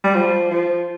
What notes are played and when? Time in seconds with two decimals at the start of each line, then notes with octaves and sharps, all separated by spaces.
0.04 G3
0.14 F3
0.51 F3